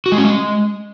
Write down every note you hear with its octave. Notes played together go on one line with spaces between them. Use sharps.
F#4
G#3
C#4
G#3